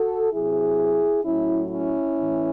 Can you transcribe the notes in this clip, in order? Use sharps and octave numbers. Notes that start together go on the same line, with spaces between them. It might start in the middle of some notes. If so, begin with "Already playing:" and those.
Already playing: F#4 A4
C3 F#3 E4 G#4
A2 F#3 C#4 E4
C#4 E4
A2 E3